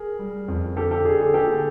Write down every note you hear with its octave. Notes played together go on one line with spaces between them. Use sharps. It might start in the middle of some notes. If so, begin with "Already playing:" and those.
Already playing: G#4 A#4
G3
F2
D3 G4 A4
G4 A4
D3 G#4
G#4
D3 G4 A4